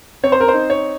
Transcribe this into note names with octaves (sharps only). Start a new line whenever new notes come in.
C4 C#5
C5
A#4
C5
D#4
C#5